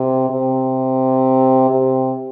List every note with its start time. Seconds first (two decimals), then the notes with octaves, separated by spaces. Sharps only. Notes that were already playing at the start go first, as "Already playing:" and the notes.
Already playing: C3
0.30 C3
1.70 C3